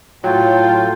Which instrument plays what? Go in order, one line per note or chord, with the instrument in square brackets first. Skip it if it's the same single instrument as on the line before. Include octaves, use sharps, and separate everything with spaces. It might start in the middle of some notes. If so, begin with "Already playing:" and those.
[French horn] A2 [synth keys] F#3 [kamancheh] F4 A4 [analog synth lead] G5